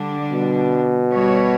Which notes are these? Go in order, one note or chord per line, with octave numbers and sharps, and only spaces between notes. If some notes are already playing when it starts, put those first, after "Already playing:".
Already playing: D3 G3 D4
B2
G3 B3 F#4 C#5